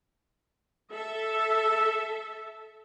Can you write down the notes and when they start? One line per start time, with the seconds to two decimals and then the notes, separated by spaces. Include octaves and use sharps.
0.92 A4 E5